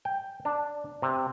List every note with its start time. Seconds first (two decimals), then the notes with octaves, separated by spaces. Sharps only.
0.05 G5
0.45 D4
1.02 C3